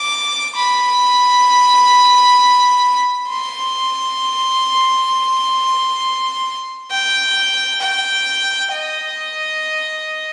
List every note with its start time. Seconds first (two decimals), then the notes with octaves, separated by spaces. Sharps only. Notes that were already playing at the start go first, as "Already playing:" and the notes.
Already playing: D6
0.55 B5
3.29 C6
6.91 G5
7.81 G5
8.72 D#5